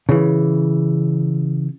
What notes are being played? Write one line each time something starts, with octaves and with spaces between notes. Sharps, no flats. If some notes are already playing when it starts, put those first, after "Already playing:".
C#3 E3